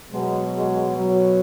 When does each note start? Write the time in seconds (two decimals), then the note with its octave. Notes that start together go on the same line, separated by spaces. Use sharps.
0.11 B2 F#3 G#3
0.54 G#3
0.97 F#3